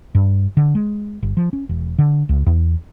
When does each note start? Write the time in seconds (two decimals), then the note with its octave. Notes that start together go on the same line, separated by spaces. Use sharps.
0.15 G2
0.57 D3
0.75 G#3
1.23 G1
1.37 F3
1.53 C#4
1.69 E1
1.98 D3
2.29 C#2
2.46 E2